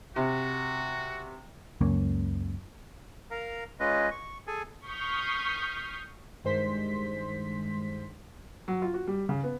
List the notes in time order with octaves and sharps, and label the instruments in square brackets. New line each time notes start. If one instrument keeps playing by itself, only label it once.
[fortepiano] C3 [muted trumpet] F#4
[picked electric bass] C#2 F#2 A#3 C#4
[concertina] A#4 F5 A#5
G#3 C#4 F4 B4 D#5
C#6
G#4 A4 G#5
[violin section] C#6 D#6 F6 G6 B6 C7
[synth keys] G2 D#3 G#3 C5 C6 B6
[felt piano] F#3
F4
F#4
G3
C#3
B3